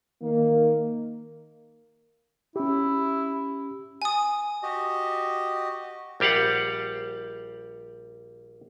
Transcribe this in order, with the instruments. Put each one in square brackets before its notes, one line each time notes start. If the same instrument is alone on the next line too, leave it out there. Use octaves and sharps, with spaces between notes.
[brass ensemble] D#3 A#3
[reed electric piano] C#4 G4 [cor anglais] E4
[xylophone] G#5 D#6
[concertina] F#4 G4 D#5
[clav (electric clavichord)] A#1 G3 G4 F5 F#5